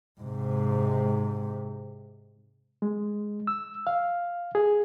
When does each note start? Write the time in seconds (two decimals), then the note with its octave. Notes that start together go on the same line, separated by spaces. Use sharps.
0.21 G#2 C3
2.82 G#3
3.47 E6
3.87 F5
4.55 G#4